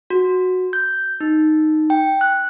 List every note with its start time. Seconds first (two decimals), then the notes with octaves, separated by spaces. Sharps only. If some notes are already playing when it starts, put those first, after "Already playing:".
0.10 F#4
0.73 G6
1.20 D#4
1.90 G5
2.21 F#6